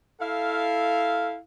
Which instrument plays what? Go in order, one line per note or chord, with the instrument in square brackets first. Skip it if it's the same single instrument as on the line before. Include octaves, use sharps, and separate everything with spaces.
[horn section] E4 A4 F5